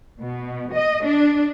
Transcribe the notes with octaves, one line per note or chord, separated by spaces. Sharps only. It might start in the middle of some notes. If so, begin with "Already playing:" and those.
B2
D#5
D4